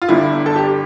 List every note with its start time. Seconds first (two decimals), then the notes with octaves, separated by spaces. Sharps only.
0.02 F4
0.08 G1 G2 D3 E4
0.46 A4
0.56 G4